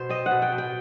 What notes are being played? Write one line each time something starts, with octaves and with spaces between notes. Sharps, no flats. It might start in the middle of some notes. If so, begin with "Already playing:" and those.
Already playing: B2 C5
C4 D#5
F#5
B2
G5
B2
G5